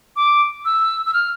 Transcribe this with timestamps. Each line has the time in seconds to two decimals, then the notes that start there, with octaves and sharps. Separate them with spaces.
0.16 D6
0.65 E6
1.06 E6
1.14 F6